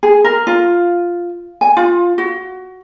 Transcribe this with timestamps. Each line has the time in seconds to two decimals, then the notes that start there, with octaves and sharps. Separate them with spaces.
0.03 G#4
0.24 A#4
0.47 F4
1.61 G#5
1.77 F4
2.18 F#4